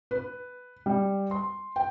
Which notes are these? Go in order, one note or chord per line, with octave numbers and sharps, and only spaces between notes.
B4
G3
C6
G5